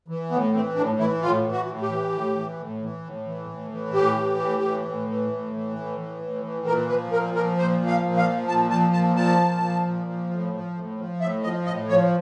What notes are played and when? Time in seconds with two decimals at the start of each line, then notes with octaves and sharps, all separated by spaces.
0.08 E3
0.31 A2 B3
0.54 E3 C4
0.75 A2 D4
0.98 E3 E4
1.21 A2 F4
1.44 E3
1.52 F#4
1.67 A2
1.82 G4
1.89 E3
2.12 A2
2.34 E3
2.57 A2
2.81 E3
3.03 A2
3.25 E3
3.49 A2
3.71 E3
3.93 A2 G4
4.16 E3
4.39 A2
4.62 E3
4.85 A2
5.08 E3
5.29 A2
5.53 E3
5.76 A2
5.98 E3
6.21 A2
6.43 E3
6.66 A#2 A#4
6.88 F3 B4
7.12 A#2 A#4
7.34 F3 A#4
7.57 A#2 C5
7.80 F3
7.87 F5
8.03 A#2
8.17 F5
8.25 F3
8.48 A#2 A5
8.70 F3 A5
8.93 A#2 A5
9.16 F3 A5
9.39 A#2
9.62 F3
9.84 A#2
10.06 F3
10.30 A2
10.53 F3
10.74 A2
10.97 F3
11.20 A2 E5
11.42 F3 D#5
11.66 A2 D#5
11.88 F3 C#5